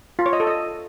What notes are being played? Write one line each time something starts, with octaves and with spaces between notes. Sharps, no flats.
F4
C#5
D#5
A4
D#5